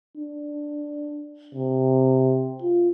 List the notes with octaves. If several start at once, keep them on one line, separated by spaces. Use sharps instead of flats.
D4
C3
F4